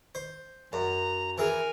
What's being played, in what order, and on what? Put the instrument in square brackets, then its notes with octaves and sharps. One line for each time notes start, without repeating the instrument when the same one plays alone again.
[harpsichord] C5
[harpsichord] F#2 [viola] A#5
[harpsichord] E3 G#4 [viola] A#4 G#5